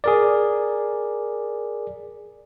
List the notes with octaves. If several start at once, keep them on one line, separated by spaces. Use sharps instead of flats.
G#4 A#4 D5